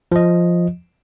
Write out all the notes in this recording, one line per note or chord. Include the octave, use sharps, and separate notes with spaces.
F3 D#5